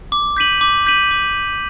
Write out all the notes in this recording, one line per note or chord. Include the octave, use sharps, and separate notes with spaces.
D6
G6 B6 D#7 F#7
D6
G6 B6 D#7 F#7
D6